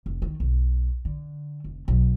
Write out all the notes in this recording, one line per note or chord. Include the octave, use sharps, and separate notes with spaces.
F1
D#3
B1
D3
F1
B1